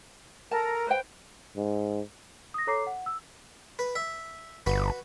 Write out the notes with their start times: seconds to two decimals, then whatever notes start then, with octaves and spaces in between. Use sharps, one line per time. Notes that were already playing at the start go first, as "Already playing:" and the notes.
0.51 A4 A#4 A5 A#5
0.87 B4 C5 G5
1.57 G#2
2.54 D#6 A#6
2.67 A4 C#5 A#5 D6 C7
2.87 F#5
3.06 E6
3.79 B4
3.95 E5
4.66 G1 F#4 B4